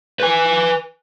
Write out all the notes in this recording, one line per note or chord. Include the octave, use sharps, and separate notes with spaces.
B4 G#5